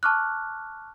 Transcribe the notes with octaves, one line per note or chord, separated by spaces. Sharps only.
A5 C#6 D6 F6 F#6